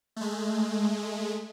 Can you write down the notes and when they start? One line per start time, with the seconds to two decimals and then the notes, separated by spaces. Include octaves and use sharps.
0.16 G#3 A3